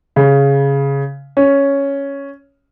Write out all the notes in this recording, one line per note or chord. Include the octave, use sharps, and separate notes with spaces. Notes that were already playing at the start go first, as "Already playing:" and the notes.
C#3
C#4